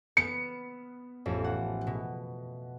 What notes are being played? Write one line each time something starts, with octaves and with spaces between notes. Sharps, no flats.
B3 C#7
A1 F2
F#5
B2